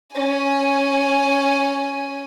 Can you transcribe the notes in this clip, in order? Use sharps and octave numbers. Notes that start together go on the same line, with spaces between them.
C#4 G#5